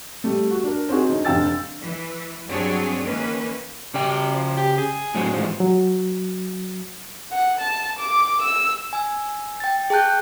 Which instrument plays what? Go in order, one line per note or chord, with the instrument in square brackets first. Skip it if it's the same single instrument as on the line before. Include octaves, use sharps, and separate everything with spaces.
[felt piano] G3 A3
F#4
D4 A#4
C4 D#4 F#4 G#4
D2 C#4 D#4
F1 D3 F5 G5 E6 A6
[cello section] E3
G2 F#3 C4 D4 G#4 C#5
D#3 E3 A#3 C#4 B4
[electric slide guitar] C#3 G5 [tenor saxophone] G3
[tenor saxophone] F3
G4
G#4
[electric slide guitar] A2 F#3 C4
[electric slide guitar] G#2 E3 [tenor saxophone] F3
[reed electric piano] F#3
[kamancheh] F#5
A5
D6
E6
[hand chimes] G#5 E6
G5 A6
G#4 G5 A5 F#6 G6